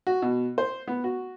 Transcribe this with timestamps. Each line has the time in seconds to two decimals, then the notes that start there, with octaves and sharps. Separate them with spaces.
0.07 F#4
0.22 B2
0.58 C5
0.87 B3
1.04 F#4